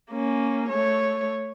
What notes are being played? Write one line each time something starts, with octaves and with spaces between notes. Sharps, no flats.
A#3 C#4
A3 C#5